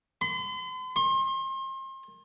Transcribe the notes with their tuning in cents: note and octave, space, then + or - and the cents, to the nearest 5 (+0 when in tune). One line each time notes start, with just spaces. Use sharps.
C6 -45
C6 +35